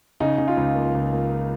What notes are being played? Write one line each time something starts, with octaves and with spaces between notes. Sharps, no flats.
C#3 D#4
C#3
F4
C#2
A#3
C#2
A#3